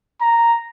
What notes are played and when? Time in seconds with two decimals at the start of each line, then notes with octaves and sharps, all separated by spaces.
0.21 A#5